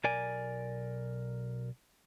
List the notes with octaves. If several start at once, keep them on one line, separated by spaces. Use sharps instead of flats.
B1 A#4 D5 G#5